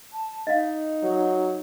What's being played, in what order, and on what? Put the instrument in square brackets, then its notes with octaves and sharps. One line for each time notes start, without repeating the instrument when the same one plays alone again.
[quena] A5
[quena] D#4 [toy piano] D#5 F5
[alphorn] F#3